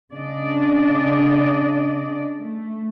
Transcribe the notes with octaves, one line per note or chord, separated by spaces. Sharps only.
C#3 D4 D5 D#5
A3